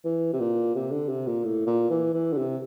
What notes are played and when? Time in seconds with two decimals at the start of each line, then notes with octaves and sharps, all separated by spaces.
0.05 E3
0.33 C3
0.40 A#2
0.75 C3
0.91 D3
1.09 C3
1.27 A#2
1.44 A2
1.67 A#2
1.90 E3
2.14 E3
2.33 D3
2.37 C3